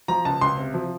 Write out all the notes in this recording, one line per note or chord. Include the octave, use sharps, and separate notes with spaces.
F3 A#5
C#2 A5
C#2 C6
C3
F3